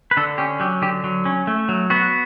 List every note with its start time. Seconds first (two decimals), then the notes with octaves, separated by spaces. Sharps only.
0.11 B4
0.17 D3 A4
0.38 C#4 G4
0.60 F#3 G4
0.82 D3 G4
1.04 F#3
1.25 C#4
1.47 A3
1.69 F#3
1.90 B3 F#4